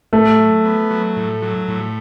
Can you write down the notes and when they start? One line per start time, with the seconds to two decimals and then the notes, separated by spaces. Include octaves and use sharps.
0.13 A2 A3
0.38 F#3
0.65 B3
0.91 F#3
1.16 A2
1.42 F#3
1.68 A2